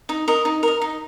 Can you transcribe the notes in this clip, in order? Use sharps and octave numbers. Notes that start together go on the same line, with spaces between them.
D#4
A#4 D#5
D#4
A#4 D#5
D#4